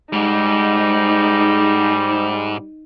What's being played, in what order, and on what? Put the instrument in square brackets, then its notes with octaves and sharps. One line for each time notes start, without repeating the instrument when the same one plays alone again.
[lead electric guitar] G#2 [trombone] G3 [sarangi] D#4